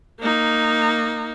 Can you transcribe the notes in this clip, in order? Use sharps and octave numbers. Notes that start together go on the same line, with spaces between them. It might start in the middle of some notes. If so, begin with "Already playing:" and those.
A#3 D#4